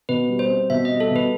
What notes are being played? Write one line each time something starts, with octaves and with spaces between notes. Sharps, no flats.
B2 B4
G3
C5
C4
B2 E5
D#5
G3
A4
B2 B4